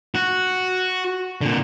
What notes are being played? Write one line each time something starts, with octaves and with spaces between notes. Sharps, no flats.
F#4
A#2 D3